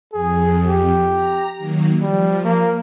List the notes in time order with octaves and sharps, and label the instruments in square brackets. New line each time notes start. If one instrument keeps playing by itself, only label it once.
[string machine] F2 [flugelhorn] G#4
[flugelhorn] G4
[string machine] A#5
D#3 F#3 A#3
[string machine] F3 [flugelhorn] G3
[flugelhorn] A#3